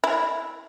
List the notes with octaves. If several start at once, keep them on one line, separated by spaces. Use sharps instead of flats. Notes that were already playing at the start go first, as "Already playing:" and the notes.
E4